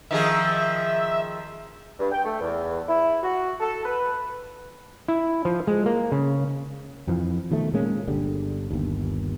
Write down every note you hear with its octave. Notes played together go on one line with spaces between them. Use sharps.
D#3 F3 G#4 E5
G2
G5
A3
E2
E4
F#4
A4
B4
E4
F3
G#3
A#3
C#3
F2 E3 F3
B2 D#3 F3 A3
A#2 G#3 A#3 C#4
G1 D3 G3
G1 D#2